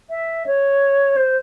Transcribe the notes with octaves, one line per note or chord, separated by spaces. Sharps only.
E5
C#5
C5